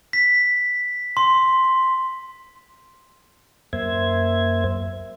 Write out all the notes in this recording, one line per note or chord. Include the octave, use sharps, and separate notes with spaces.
B6
C6
F#2 A#3 C5 E5 G#6